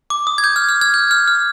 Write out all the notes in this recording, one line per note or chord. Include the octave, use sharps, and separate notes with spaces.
D6
D#6
G#6
G6
F6
F6
F6 G#6
G6
F6
F6